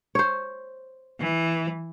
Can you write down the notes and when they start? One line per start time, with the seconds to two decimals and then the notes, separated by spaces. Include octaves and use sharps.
0.15 C5 C#5
1.20 E3